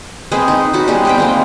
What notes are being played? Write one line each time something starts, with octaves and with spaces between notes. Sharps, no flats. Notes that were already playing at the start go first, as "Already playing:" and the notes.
G#3 C4 G#4 B4
D#4
C#4 F#4 B5
G3 G#3 B3 G#4
C4 B4 G5
G#3 A#3 C4